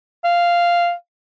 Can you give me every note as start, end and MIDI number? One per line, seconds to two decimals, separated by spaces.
0.25 0.92 77